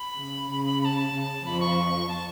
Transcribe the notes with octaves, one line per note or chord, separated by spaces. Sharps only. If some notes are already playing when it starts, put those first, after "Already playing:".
Already playing: B5
C#3
C#3 B5
B5
B5
A5
C#3
F2 F3 B5
C#6
A5